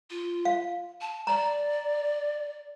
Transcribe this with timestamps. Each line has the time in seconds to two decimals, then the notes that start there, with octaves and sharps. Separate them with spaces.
0.10 F4
0.45 F5
1.01 A5
1.27 D5 A#5